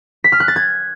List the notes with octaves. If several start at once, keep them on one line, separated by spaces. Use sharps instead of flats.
B6
F6
F#6
A6
G#6